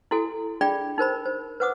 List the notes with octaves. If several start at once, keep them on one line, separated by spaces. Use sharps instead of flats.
E4 F#4 A4 G#5
D4 F4 G#4 D5 G5 B5
D#4 A#4 C5 B5
C5
B4 C5 F#5 D6 D#6